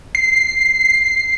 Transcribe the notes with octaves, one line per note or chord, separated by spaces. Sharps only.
C7